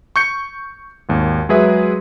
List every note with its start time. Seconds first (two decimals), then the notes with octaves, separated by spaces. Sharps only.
0.16 C#6 G6 C#7
1.09 G#1 D#2
1.49 F#3 G#3 G#4 B4 E5